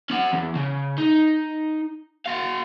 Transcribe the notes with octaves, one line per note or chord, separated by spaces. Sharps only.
C#4 F#5
E2
C#3
D#4
F#4 F5